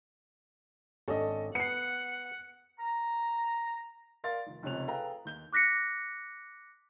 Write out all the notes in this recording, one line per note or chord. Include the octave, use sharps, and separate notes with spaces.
G#1 C#4 D4 A4 D#5
B3 F#5 C7 C#7
A#5
A#4 D5 F5 C6 A6
F1 D#3
F1 C#2 C3 C#4 F#6 F7
G#4 A4 B4 F5 G5 A#5
D#2 G6 G7
D6 F#6 A#6 B6 C#7